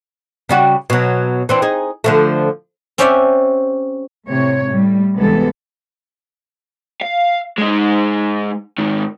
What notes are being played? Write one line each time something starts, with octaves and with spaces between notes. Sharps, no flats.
C#3 G3 F#4
B2 F#3
E3 C4 D4
D#4 G#4
D3 F3 A3
C4 C#4 G4 D5 E5 F#5
A2 C3 C#5
A2 G3
D2 C3 E3 G#3 B3 A4
F5
G#3 D#4
G#2 D#3